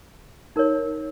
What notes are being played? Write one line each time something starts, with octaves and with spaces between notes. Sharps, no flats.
D#4 A#4 C#5